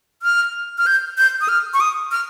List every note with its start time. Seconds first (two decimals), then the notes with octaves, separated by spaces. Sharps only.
0.23 F6
0.78 F6
0.86 G6
1.18 G6
1.41 D#6
1.49 F6
1.74 C#6
1.80 D#6
2.12 F6